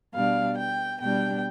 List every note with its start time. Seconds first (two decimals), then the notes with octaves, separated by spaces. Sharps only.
0.14 B2 G3 D4 F5
0.57 G5
1.00 B2 G3 D4 G5